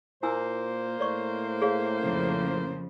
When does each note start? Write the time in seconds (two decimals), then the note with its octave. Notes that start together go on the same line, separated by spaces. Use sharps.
0.23 A#2 A#3 E4 C5 G#5 E6
1.00 A2 C#5 D5 C#6
1.62 G#4 C#5 F5
2.04 F2 C#3 F3